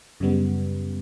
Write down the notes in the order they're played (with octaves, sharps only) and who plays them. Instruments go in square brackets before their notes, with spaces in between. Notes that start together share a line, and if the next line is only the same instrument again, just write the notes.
[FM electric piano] F#2 C#3 G3 B3